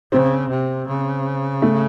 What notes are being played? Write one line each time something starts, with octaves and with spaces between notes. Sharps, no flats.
C#3 C4
C3
C#3
A3